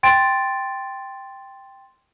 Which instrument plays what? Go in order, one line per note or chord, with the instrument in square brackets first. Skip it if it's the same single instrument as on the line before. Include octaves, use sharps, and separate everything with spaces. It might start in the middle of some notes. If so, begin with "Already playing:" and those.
[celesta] G5 C6 A6 D7